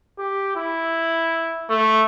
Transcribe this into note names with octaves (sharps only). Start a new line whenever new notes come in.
G4
E4
A3